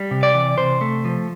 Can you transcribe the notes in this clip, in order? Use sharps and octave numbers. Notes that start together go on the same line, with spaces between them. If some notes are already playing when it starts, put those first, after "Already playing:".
Already playing: G3
C3
D5
E3
C3 C5
A3
F3